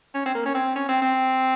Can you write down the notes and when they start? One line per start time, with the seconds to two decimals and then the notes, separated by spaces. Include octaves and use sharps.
0.14 C#4
0.26 C4
0.35 A#3
0.45 C#4
0.55 C4
0.76 C#4
0.89 C4
1.02 C4